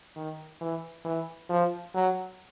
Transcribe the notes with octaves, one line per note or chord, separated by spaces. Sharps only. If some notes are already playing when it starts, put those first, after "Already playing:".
D#3
E3
E3
F3
F#3